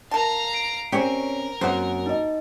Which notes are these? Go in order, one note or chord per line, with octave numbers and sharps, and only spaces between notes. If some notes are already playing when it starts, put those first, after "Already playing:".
A#4 F5 A5 A#5
C7 D7
C4 C#4 G4 A#4 C#5 D5
F#2 A#3 C4 F#4 C5 F#5
D#4 D#5